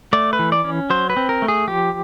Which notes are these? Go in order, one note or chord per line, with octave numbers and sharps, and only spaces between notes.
A3 D5
B4
E3
D5
C#4
F#3 C5
B4
C4
A#4
A3
G#4
F3 G4